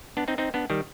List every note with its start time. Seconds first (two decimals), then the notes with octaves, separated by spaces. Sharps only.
0.17 B3 D4
0.28 C4 D#4
0.38 C4 D#4
0.54 B3 D4
0.70 D#3 G3